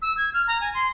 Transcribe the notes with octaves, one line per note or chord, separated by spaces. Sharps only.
E6
G#6
F6
A#5
G#5
C6